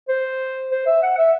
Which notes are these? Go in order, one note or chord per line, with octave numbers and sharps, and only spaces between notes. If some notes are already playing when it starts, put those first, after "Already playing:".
C5
C5
E5
F#5
E5